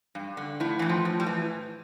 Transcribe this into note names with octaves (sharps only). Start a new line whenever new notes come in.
G2
D3
A2 E4
A2 E3
F3
A2
G3
E3